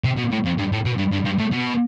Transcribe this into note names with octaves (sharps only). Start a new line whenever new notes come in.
C3
B2
A2
F2
G2
A2
B2
G2
G2
G2
A2
B2